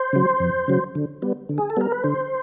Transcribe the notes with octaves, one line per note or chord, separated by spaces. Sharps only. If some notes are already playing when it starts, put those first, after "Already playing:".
Already playing: C5
C#3 F#3
F2
C#3 F#3
D3
G3 B3
D3
G#4
A4
G3 B3 A#4
B4
D3 C5